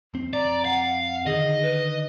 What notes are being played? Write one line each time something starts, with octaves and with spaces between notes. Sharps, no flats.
F2 C4
D5 A#5
F5 F#5
D3 D#3 G#4 D#5
B4